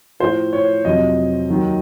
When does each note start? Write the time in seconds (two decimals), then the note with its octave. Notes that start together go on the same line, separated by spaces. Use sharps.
0.20 A2 F3 C5
0.53 C#5
0.85 F2 C3 F#3 D#5
1.49 D#2 D#3 F#3